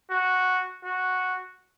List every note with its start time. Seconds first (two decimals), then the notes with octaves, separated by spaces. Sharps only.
0.11 F#4
0.85 F#4